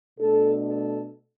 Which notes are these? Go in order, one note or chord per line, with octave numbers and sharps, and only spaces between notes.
B2 A3 D4 A4
A4